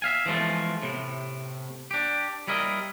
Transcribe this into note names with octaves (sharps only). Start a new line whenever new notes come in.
E5 F5 G#5
E3 F3 G#3 A3 F4
A2 C3
D4 G4
G3 E4 A#4 D#5